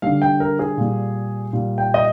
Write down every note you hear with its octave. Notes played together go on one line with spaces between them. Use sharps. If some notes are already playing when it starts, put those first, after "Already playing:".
D3 G3 F5
G5
A#4
G#4
A#2 G3
A#2 G3
G5
D#5